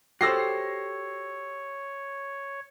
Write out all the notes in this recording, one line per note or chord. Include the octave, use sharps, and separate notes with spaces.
F#4 G4 A4 C5 C#5 E6 A#6 C7